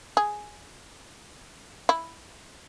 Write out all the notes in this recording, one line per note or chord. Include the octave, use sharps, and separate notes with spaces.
G#4
E4